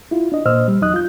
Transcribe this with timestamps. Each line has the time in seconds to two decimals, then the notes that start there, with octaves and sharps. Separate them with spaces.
0.11 E4 F4
0.32 D4 D#5
0.46 A#2 C5 D#5 E6 F6
0.68 G3
0.81 E2 F#3 D#4 D#5 D#6 F#6
0.94 F4 G6